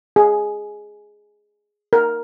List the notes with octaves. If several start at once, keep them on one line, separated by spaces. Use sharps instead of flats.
G#4
A#4